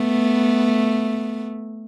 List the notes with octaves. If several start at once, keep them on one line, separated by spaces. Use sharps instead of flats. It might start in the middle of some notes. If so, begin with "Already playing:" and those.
Already playing: A3 B3